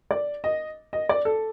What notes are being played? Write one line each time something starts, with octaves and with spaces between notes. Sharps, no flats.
D5
D#5
D#5
D5
A4